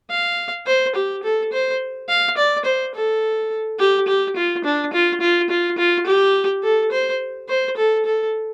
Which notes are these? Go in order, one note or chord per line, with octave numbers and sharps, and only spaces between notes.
F5
C5
G4
A4
C5
F5
D5
C5
A4
G4
G4
F4
D4
F4
F4
F4
F4
G4
A4
C5
C5
A4
A4